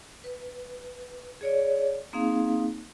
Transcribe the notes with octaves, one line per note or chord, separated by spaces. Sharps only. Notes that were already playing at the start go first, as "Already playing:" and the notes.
B4
G#4 C#5 D5
A#3 C4 D#4 G#4 F5